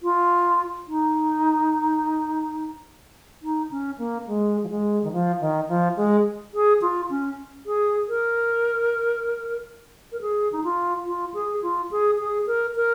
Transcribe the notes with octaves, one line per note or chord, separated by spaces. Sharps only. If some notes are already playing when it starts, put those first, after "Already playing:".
F4
D#4
D#4
C#4
A#3
G#3
F3
G#3
D#3
F3
D#3
F3
G#3
G#4
F4
C#4
G#4
A#4
A#4
G#4
D#4
F4
F4
G#4
F4
G#4
G#4
A#4
A#4